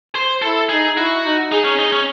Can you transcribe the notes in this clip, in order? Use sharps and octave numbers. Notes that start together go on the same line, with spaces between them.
C5
E4 A4
D#4 G#4
E4 F#4
D#4
D#4 G#4
C#4
D#4
C#4